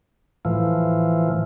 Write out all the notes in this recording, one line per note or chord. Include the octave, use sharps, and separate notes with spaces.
A2 E3 F3